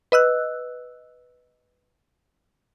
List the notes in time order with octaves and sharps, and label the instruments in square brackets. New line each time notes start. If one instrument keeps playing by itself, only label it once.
[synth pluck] B4 D#5 E6 F#6